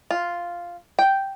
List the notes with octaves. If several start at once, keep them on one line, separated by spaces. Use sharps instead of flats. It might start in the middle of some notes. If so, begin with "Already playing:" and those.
F4
G5